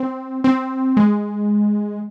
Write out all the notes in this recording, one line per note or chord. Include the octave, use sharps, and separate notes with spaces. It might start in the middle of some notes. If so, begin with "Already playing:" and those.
Already playing: C4
C4
G#3